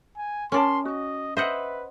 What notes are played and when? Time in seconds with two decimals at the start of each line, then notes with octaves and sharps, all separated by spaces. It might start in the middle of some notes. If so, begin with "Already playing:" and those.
0.17 G#5
0.52 C#4 A#4 D5 A5 C6
0.85 F#4 D#5
1.37 B4 C5 D#5 E5 F#5